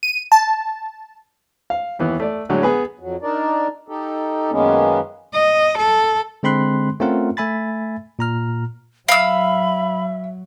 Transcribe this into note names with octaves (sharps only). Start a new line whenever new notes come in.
D#7
A5
F5
D#2 E3 B3
A3 D5
A2 D3 F#3 G#3
B3 G#4 B4
F2 F#3
D4 D#4 A#4 D5
D#4 G4 A4
F#2 D#3 G#3 A#3 B3 C#4
D#5
A4
D3 G#3 C4 B5 C6 F#6
A3 C4 C#4 F4 A#4 F#5
A3 E5 G#5 B5 A6
A#2 A#5 F6
F#3 E5 F5 B5 E6